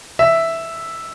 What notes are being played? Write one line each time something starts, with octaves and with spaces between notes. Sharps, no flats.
E5